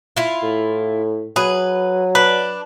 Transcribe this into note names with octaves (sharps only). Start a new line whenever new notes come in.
E4 F4
A2
F#3 G#4 B4
D4 B4